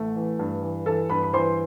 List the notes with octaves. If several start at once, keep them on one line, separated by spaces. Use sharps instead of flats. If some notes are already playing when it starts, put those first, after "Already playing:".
Already playing: A1 A3
E3
G2
E3
E3 A4 A5
G2 B4 B5
B5
E3 C5 C6